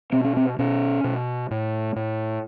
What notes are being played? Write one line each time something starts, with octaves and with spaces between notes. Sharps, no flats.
B2 C4
C#4
C4
B2 C#4
B2
A2
A2